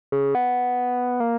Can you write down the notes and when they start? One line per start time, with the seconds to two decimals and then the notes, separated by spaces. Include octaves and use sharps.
0.12 C#3
0.35 B3
1.20 A#3